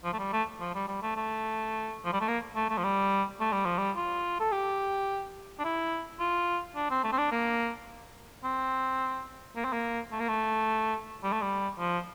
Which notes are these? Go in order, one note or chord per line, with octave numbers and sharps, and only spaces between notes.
F3
A3
G3
A3
F3
G3
G3
A3
A3
F3
G3
A3
A#3
A3
A3
F3
G3
A3
G3
F3
G3
F4
A4
G4
D4
E4
F4
D4
C4
A3
C4
D4
A#3
C4
A#3
C4
A#3
A3
A#3
A3
G3
A3
G3
F3